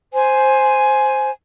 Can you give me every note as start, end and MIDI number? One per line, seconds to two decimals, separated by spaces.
0.13 1.29 72
0.13 1.29 80